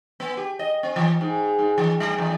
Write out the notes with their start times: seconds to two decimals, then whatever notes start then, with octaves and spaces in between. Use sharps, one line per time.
0.20 B3
0.37 G4
0.59 D#5
0.83 C4
0.96 E3
1.21 G#2
1.59 G#2
1.78 E3
2.00 G3
2.18 E2